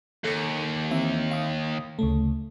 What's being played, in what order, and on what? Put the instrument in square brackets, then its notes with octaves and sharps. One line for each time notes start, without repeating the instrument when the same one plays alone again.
[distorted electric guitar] D#2 [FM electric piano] A4 C#7
[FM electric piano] E3 C4 E5
F5 D#6
D2 C#3 A3